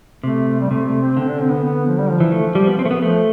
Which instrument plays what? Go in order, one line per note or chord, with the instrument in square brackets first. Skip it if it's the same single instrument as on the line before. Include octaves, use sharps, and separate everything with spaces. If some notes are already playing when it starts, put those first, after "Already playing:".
[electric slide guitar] C3 [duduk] A3
[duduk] G3
[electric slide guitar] C3 [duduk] A3
[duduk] A3
C4
[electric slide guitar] D3 [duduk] C4
[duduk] D4
C4
B3
B3
F3
G3
F3
[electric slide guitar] E3
A3
G3
B3
C4
A3
B3
[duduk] F3 [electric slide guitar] A3